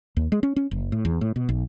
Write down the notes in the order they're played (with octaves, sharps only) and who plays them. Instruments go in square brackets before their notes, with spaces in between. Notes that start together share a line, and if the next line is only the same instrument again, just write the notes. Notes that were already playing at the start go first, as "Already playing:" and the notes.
[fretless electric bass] D#2
G#3
C#4
C#4
F#1
A2
E2
A2
B2
B1